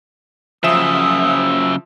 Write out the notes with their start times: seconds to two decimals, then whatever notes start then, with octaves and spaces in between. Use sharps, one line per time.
0.63 F#2 C#3 F3 E5 D#6 E6 E7